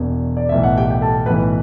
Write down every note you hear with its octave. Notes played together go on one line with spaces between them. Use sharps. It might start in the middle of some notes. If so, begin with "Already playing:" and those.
Already playing: E1 E2 B2
D5
B1 A2 E3 E5
F#5
G4 G5
G5
A4 A5
B1 A2 E3 B4 B5